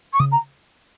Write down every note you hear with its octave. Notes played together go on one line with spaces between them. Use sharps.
C#6
C#3 D#6
A#5